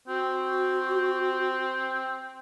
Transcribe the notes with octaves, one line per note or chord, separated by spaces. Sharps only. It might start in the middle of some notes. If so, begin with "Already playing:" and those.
C4 F#4